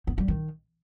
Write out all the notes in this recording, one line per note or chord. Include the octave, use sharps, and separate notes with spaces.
B3
G3
D#3